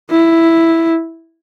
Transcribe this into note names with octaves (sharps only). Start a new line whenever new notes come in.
E4